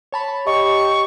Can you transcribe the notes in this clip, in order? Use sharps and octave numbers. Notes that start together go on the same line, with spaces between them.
C#5 A5 B5
G4 D#5 C#6